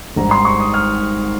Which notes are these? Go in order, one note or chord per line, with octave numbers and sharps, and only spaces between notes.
G#1 G#2 G3 A#5
C6
C#6
D#6
F6